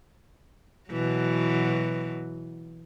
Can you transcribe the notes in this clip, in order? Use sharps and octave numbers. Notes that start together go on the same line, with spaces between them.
B2 E3 F#3